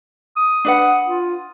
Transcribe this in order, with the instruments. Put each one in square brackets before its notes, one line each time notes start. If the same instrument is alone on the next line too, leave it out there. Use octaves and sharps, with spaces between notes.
[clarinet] D#6
[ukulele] D4 B4 F#5
[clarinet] F4